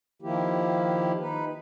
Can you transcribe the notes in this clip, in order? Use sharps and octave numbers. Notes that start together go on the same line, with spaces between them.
D#3 F3 A#3 E4 G4
D#4 B4